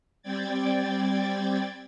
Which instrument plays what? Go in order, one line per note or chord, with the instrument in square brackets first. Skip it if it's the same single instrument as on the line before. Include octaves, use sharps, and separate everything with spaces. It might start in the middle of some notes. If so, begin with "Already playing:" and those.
[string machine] G3 C4 D5 G5 G#6 A6